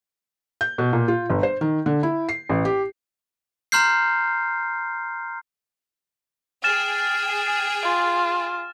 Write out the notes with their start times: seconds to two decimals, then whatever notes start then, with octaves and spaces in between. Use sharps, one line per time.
0.61 G6
0.78 B2
0.93 A#2
1.08 F4
1.30 G1
1.43 C5
1.61 D#3
1.86 D3
2.03 E4
2.29 C7
2.49 A1
2.65 G4
3.72 A#5 C6 F6 G6 C7
6.64 G#4 G5 F6 A6 E7
7.83 F4